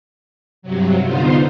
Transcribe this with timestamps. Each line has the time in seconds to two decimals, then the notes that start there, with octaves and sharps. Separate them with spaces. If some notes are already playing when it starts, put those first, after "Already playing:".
0.62 G2 C3 F#3
1.03 D3 B3 D#4 F4 C5